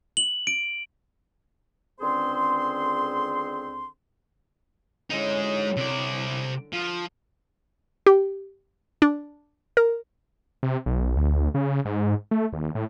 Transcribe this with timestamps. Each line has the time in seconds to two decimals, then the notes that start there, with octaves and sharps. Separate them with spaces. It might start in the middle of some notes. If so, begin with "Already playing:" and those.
0.17 F#7
0.47 D7
2.00 C#2 D3 C4 G#4 C5 C6
5.10 D3 G#3 C#4 D#4 E4
5.43 F#3
5.77 C3 D5
6.73 F3
8.06 G4
9.02 D4
9.77 A#4
10.63 C3
10.86 B1
11.16 D2
11.54 C#3
11.85 G#2
12.31 A3
12.53 D#2
12.75 A2